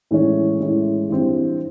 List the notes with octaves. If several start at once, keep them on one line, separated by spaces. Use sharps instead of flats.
A2 E3 G#3 C#4 E4
A2 E3 G#3 C#4 E4
G2 E3 G3 C4